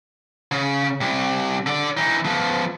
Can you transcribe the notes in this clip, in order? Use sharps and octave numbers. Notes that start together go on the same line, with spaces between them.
C#3
C3 G3
D3 D5
E3 D#4
F3 B3